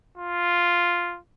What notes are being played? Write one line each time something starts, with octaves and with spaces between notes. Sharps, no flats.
F4